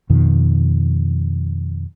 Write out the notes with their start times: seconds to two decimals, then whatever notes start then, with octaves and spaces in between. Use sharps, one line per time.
0.10 F2 B2 D#3